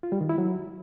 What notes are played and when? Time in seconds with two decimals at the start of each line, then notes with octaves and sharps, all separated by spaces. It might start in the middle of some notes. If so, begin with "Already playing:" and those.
0.03 F4
0.12 G3
0.21 D#3
0.29 E4
0.38 F#3